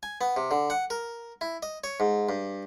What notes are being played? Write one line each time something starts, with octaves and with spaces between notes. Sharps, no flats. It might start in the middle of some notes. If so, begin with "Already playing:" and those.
G#5
B3
C3
D3
F#5
A#4
E4
D#5
C#5
G#2
G2